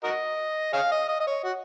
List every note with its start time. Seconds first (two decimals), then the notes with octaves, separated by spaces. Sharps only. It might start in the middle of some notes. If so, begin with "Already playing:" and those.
0.04 F#4 A#4 D#5
0.73 G#4 C#5 F5
0.92 D#5
1.08 D#5
1.20 D#5
1.27 C#5
1.44 F#4